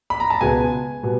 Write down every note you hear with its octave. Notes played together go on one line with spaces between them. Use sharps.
B5
A#5
A5
C#2 B2 G#3 B3 G#5
B2 G3 B3